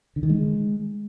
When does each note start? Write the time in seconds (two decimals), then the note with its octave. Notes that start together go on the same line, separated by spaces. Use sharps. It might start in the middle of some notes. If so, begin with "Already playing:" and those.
0.16 D3
0.23 D#3
0.30 G#3